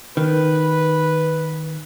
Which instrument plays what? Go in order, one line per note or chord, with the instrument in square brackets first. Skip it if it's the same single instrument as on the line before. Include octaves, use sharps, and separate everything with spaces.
[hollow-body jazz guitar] D#3 [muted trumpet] B4